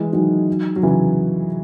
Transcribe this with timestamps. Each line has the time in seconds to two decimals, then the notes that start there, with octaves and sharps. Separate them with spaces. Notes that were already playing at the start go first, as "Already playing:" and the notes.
Already playing: E3 G#3
0.13 D#3 F#3
0.76 F#3
0.83 C#3 E3